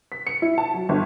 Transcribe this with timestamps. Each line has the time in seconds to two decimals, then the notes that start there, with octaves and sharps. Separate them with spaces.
0.12 B6
0.27 C#7
0.42 E4
0.58 A5
0.74 F#3
0.89 G1